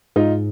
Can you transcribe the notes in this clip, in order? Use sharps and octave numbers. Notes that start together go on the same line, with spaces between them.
G#2 D#4 F4